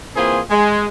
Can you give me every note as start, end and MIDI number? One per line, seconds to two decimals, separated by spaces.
0.17 0.40 52
0.17 0.40 58
0.17 0.40 60
0.17 0.40 65
0.17 0.40 68
0.17 0.40 72
0.50 0.87 56